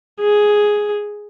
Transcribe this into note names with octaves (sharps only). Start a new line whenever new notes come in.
G#4